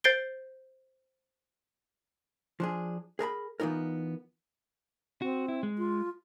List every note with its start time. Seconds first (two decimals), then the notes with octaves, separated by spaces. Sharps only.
0.04 C5 G6 A6 C7 D7 G7
2.60 F3 D4 G#4
3.19 G#4 A#4 A5 B5
3.60 E3 B3 D#4 F4 A#4
5.22 C4 F#4
5.48 E4
5.63 G#3
5.78 F4